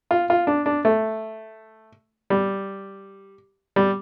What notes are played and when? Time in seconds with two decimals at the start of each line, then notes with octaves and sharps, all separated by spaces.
0.11 F4
0.30 F4
0.47 D4
0.66 D4
0.85 A3
2.30 G3
3.76 G3